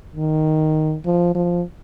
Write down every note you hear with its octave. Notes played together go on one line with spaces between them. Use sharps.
D#3
F3
F3